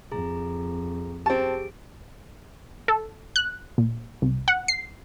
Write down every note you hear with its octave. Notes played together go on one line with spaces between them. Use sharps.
F2 G#4 A#5
C4 G4 G#4 A5 D7
A4
F#6
A#2
C2
F#5
C7